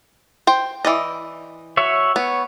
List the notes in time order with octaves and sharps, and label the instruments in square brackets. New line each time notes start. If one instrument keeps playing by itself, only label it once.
[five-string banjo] C5 G5
E3 D5 D#5
[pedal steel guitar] F#4 C#5 E5
[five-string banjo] B3 [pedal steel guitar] C#5